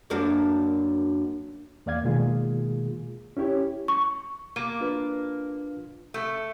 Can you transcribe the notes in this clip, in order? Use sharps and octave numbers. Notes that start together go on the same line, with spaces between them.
F#2 A#3 D4
E2 A#3 D5 F5 G#6
B2 D#3 G#3 A#3 F4 G#4
C#4 E4 G4 C#5
C#6
A#3
D4 F4 B4
A3